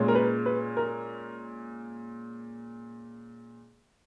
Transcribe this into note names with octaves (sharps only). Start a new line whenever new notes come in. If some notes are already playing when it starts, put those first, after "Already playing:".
Already playing: A#2 G#3 C#4
A#4
B4
B4
A#4